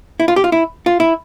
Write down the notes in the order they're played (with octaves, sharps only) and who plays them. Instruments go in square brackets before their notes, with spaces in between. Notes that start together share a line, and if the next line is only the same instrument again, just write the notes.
[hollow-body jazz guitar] E4
F4
G4
F4
E4
F4
E4